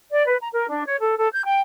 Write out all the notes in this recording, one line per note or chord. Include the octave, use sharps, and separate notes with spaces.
D5
B4
A#5
A#4
D4
C#5
A4
A4
G6
G5